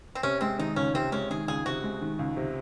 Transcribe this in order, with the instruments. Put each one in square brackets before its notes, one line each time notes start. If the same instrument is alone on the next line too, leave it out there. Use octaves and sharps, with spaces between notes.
[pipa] C4
[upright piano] C3 [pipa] C#4
[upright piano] G#3 [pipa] C4
[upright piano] D#3 [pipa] D#4
[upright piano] C#2 [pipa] C#4
[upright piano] C3 [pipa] C4
[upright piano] G#3 [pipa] C#4
[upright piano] D#3 [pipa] G#4
[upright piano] C#2 [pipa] G#4
[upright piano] C3 [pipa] F#4
[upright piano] G#3
D#3
C#2
C3